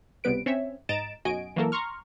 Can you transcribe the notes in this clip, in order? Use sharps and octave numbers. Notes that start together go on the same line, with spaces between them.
C#2 C3 G3 B3 B4 D7
C4 C#4 C#5 E5
G#2 D#5 A#5 A6 D7 E7
B1 F#2 F#4 D#5 G#5 D7
E3 F#3 A#3 A4 A#4
A#5 C6 C#6 F6